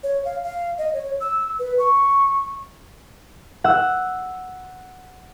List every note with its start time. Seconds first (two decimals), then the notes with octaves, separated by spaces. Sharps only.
0.03 C#5
0.25 F5
0.44 F5
0.78 D#5
0.94 C#5
1.21 E6
1.59 B4
1.79 C#6
3.64 F#5 E6